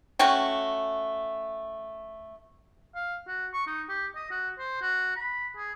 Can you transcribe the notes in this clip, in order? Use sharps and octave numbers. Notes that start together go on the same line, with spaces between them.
A3 C#4 F#4 G5
F5
F#4
C#6
D#4
G4
D#5
F#4
C5
F#4
B5
G#4